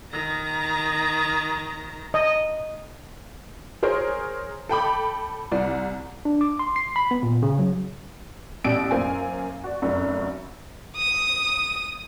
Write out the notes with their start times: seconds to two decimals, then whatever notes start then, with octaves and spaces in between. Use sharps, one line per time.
0.11 D#3 A#5
2.14 D#5
3.83 G#4 A#4 C5 C#5
4.69 A4 G5 B5 D6
5.52 C2 D5
6.25 D4
6.41 D6
6.59 C6
6.76 C7
6.96 B5
7.11 B3
7.23 A#2
7.42 C#3
7.59 F#3
8.64 A1 B2 G4 D5 E6 D7
8.91 F#2 A#3 C5 G#5
9.64 F#4 D5
9.82 F1 F#2 F#4
10.96 D#6